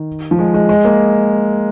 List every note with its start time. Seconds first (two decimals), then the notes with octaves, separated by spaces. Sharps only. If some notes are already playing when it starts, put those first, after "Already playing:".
Already playing: D#3
0.31 F3
0.39 G#3
0.54 G#3
0.69 G#3
0.85 A#3